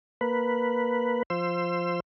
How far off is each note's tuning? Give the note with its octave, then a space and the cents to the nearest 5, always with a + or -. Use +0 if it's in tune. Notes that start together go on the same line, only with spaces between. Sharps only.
A#3 +0 B4 +0
F3 +0 C5 +0 E6 +30